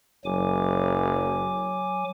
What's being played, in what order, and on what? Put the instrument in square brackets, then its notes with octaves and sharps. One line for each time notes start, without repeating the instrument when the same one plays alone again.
[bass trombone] F#1 [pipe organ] F#3 G#5 D6